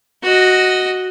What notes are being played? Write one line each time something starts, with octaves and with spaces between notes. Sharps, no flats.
F#4 D#5